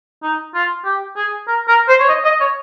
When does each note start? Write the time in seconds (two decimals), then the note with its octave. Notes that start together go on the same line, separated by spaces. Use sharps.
0.23 D#4
0.55 F4
0.85 G4
1.17 G#4
1.48 A#4
1.68 A#4
1.88 C5
2.00 C#5
2.09 D#5
2.24 D#5
2.40 C#5